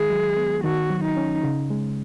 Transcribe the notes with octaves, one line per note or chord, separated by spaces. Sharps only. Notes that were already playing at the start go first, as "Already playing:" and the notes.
Already playing: D#3 G#3 G#4
F#3
B3
D#3 F#4
F#3
D#4
C#4
C#3
G#3